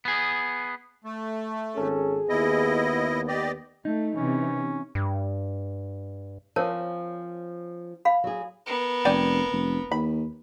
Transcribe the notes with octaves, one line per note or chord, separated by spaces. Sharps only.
B3 G#4
A3
G#1 C#4 G#4 A4
D#2 B3 E4 D#5
G4 D5 D#5
A3 D#4
C3 E3 C#4
G2
F3 C4 C#4 A#4 C#5 A5
F5 B5
F#3 G#4
B3 A#4
F1 D5 G5 G#5
F1
D#2 B5